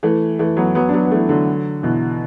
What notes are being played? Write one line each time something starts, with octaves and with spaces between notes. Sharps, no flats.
E3 A3
E3 A3
F#3 B3
F#3 B3
D4
F#3 B3
B3
E3 A3
D3 F#3
B2 E3